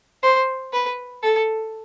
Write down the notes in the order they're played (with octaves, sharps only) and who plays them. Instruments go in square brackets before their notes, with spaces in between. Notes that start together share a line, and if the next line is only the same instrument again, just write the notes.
[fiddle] C5
B4
A4